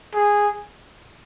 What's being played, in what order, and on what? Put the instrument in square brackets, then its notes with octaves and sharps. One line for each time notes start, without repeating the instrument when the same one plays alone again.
[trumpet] G#4